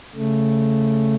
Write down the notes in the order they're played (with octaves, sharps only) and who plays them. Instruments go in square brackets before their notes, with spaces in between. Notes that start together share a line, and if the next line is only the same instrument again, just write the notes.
[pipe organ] C#3 A3